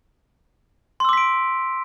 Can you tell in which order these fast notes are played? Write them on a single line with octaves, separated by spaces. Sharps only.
C6 E6 D6 B6 D7